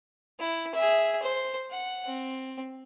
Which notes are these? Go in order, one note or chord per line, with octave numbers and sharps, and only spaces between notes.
E4
G#4 E5
C5
F#5
C4